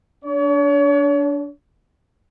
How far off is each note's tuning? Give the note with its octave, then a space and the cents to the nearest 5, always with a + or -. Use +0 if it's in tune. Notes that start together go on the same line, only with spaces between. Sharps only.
D4 -20 C#5 +40